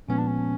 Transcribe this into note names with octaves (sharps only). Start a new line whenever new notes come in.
A#2 F3 G#3 B3 C#4
D4
C#4